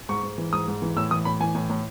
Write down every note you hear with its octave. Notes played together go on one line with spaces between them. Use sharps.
G#2 C#6
G#2
E3
G#2 D#6
G#2
E3
A2 E6
E3 D#6
A2 B5
E3 G#5
A2
A2